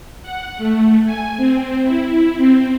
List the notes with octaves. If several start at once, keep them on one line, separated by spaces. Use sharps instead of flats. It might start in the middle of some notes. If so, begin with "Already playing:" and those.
F#5
A3
G#5
C4
E4
C4